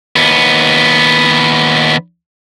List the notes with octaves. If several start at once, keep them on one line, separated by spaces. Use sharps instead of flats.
D#2 B3